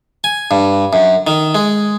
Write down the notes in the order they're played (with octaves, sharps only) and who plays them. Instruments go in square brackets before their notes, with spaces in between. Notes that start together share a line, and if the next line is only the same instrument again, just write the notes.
[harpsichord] G#5
G2
F#2
D#3
G#3